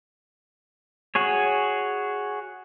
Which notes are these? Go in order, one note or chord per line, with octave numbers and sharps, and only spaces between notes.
F#4 G#4 C#5